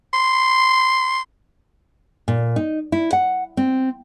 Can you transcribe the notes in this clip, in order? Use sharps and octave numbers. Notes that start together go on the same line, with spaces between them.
C6
A#2
D#4
E4
F#5
C4